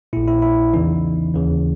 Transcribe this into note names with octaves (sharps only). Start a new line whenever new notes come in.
A#1 A#2 E4
E4
E4
E2 C#3 E3 D#4
D#2 C#3 E3